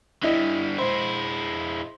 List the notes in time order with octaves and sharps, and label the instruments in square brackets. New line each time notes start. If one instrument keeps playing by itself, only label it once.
[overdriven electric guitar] D3 G3 [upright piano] E4 D#5
[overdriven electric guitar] G#3 E4 [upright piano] C5